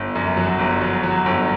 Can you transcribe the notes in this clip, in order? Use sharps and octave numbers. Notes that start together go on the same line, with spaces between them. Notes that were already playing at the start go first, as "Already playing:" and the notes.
Already playing: G1
F#2
F#3
G1
F#3
F#3
G1